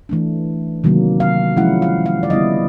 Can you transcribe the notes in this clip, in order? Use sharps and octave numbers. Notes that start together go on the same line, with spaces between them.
E3 A3 D4
C3 D#3 F#3 A#3
F5
F3 G#3 C#4 E4 F#5
F5
F5
D5
D3 G3 B3 E4 D#5